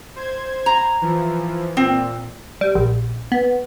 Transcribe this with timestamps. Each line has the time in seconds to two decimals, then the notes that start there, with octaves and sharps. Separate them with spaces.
0.16 C5 G#6
0.66 A#5
1.02 E3 F3
1.77 A#2 C4
2.61 G3
2.75 A#1
3.32 B3